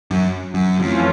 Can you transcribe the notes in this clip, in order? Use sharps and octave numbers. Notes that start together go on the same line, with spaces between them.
F#2
F#2
F2 E3 A3 C#4 F4